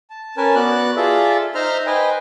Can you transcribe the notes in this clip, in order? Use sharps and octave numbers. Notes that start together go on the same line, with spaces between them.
A5
C#4 A#4 B4 G#5 A5
B3 F#4 D5 F#6
F4 G#4 A4 D5 E5
D#4 C5 E5 A#5 C6 F6
B4 C5 D#5 G5 G#5